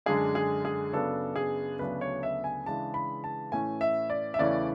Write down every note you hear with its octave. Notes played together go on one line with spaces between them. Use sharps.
F#2 D3 G#3 D4 G#4
G#4
G#4
F#2 C#3 F#3 B3 D4 A4
G#4
D2 C#3 F#3 B3 D4 B4
C#5
E5
G#5
C#3 E3 G#3 D4 A5
B5
A5
A2 E3 A3 C#4 G#5
E5
D5
E5
E2 C#3 E3 A3 C#4 D5